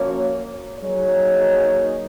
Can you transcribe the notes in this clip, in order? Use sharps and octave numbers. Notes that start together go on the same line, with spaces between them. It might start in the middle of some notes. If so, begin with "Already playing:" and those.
Already playing: F3 A#3 C#4 F#4 C#5
F#3 A#3 D#4 G#4 C#5